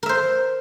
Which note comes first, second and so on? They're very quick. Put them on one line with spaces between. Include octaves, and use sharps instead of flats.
A#4 E5 C5